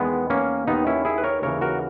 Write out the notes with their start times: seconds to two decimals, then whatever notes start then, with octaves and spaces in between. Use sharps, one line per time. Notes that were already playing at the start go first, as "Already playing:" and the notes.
Already playing: E2 D#3 G#3 B3
0.30 A#3 C#4
0.67 D#2 D#3 B3 D#4
0.87 C#4 E4
1.05 E4 G#4
1.18 B4
1.24 A#4 C#5
1.42 D#2 C#3 E3 A#4 C#5
1.61 F#4 A#4